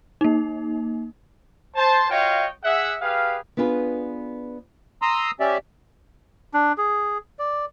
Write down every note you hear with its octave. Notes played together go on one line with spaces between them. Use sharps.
A#3 D#4
C5 A5
F4 F#4 C#5 D#5 F5 G5
G#4 E5 F#5
G4 G#4 B4 F5
B3 D4 F4 G#4 B4
A#5 C6 D#6 E6
C#4 G4 D5 E5
D4
G#4
D5